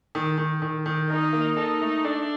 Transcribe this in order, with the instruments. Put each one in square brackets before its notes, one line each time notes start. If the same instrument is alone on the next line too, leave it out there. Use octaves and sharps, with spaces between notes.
[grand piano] D#3
D#3
D#3
D#3
[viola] D#4 [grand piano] A#4
[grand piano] A#3
[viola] D#4 [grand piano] A4
[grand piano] A3
[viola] D4 [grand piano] A4